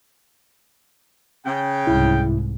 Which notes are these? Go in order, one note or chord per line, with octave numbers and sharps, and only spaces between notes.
C#3 G5
C2 G#2 E4